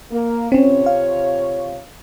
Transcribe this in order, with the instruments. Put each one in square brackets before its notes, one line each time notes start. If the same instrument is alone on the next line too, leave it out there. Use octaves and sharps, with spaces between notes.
[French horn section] A#3
[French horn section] C3 F4 C#5 [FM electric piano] C4 C#4
[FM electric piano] F5